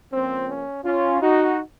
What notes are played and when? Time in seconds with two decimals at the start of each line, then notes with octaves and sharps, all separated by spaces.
0.12 C#2 C#3 F3 A#3 C4
0.49 C#4
0.85 C#4 F4
1.21 D#4 F#4